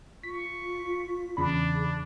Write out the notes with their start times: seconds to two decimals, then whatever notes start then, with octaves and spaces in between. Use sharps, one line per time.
0.23 F4 C#6 B6
1.37 E2 C#3 D4 G#4 B5